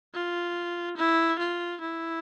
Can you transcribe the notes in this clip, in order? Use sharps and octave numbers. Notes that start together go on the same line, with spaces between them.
F4
E4
F4
E4